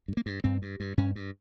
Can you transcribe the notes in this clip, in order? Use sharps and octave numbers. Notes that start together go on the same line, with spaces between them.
G2
A#3
G2
G2 C4
G2
G2
G2 C#4
G2